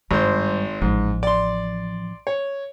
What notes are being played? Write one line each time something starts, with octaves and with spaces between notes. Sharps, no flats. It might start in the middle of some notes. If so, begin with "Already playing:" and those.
G#1 G2 G3 C5
A1 G#2 F3
D5 C6
C#5